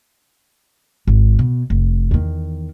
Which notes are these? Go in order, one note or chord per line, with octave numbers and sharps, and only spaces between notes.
G#1
B2
F1
E2 D#3